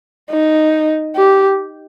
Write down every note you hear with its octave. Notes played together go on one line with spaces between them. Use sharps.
D#4
G4